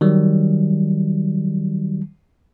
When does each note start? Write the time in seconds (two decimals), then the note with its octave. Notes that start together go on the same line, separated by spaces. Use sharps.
0.01 D#3 F#3 G3